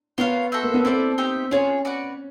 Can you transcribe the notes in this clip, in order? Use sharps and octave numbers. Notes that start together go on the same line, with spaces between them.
B3 F4 A#4 C#5 F5
F#4 A4 C5 E5
A#3
B3
C4 E4 A4 D5
D#4 G4 C5 E5
C#4 F4 G#4 C#5
F#4 B4 D5 F#5